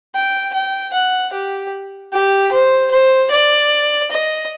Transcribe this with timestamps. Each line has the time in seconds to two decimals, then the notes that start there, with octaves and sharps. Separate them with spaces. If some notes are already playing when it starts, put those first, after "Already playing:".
0.15 G5
0.54 G5
0.93 F#5
1.33 G4
2.13 G4
2.52 C5
2.91 C5
3.31 D5
4.11 D#5